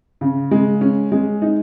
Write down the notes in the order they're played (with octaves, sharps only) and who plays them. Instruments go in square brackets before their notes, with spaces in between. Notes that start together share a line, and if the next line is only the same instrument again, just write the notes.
[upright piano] C#3
G#3
C#4
G#3
D#4